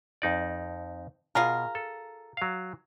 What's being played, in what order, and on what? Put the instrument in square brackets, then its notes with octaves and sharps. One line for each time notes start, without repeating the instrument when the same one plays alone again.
[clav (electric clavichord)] F2 D#4 D5
[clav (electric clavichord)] B2 [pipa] F4 G#4 A#4
[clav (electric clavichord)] A4
F#3 F5